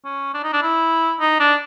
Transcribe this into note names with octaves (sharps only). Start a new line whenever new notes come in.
C#4
D4
D#4
D4
E4
D#4
D4